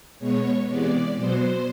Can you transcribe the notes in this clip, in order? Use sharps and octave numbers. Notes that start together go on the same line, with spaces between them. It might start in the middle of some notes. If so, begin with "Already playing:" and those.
B2 G#3 B3 C#5
C3 E3 G#3 B3 D5
B2 F#3 B3 C5